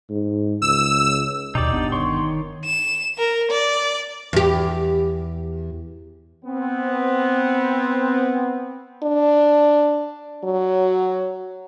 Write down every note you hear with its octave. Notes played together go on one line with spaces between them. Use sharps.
G#2
C#2 E6
D#2 B2 D#4 G4 D5
G1 B3 D4
D#3 C#5 C6
E7
A#4
D5
E2 G4
B3 C4
D4
F#3